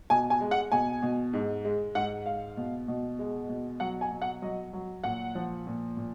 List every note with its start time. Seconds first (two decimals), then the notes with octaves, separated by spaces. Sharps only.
0.10 B2 G#5
0.30 G#5
0.41 G#3
0.51 F#5
0.72 B2 G#5
1.02 B2
1.33 G#2
1.64 G#3
1.95 G#2 F#5
2.26 G#2 F5
2.57 B2
2.88 B2
3.19 G#3
3.49 B2
3.80 F#3 F#5
4.01 G#5
4.11 B2
4.22 F#5
4.42 F#3 D#5
4.73 F#3
5.04 A#2 F#5
5.35 F3
5.67 A#2
5.97 A#2